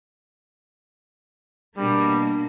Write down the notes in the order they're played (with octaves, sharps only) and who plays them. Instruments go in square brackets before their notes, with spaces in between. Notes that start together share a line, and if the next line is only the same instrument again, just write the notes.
[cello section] B2 A#3 [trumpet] G3 [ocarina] D4